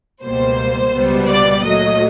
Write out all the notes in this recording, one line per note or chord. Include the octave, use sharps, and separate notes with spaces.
C#2 B2 G3 A#3 C5
C#2 B2 G3 B3
D5
A#2 F#3 A3 D#5